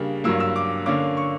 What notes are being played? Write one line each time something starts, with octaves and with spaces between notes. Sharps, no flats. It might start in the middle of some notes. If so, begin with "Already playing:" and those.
Already playing: C#3 G3 A#3 D4
G2 F#3 A#3 E6
E6
D6
D3 A#3 C#4 D6
C#6